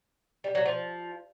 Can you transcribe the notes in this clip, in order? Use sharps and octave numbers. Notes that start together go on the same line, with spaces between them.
G3
F#3
F3